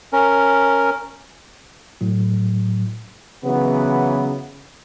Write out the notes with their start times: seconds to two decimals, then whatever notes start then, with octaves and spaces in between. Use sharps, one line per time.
0.13 C#4 A#4
2.01 A2 F#3
3.44 C#3 E3 F#3 B3